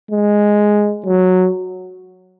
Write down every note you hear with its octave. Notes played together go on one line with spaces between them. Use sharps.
G#3
F#3